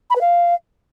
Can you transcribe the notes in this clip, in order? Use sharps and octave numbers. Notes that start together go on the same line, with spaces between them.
B5
B4
F5